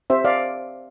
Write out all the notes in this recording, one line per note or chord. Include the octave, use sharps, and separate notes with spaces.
C4 G4 C5 E5
D5 F5